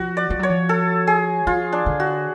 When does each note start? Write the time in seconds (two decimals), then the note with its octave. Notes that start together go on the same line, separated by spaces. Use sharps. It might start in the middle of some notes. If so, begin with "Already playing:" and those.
Already playing: F3 F#4
0.17 D5
0.30 F3
0.39 F#3 C#5
0.49 F3
0.69 A4
1.07 G#4
1.47 F3 F4
1.72 D4
1.86 D3
2.00 F#4